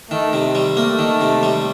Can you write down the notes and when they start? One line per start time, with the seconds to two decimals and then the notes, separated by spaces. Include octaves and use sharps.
0.11 D#3 A3
0.33 C3
0.55 G3
0.77 A3 A#3
0.99 D#3
1.21 C3
1.43 G3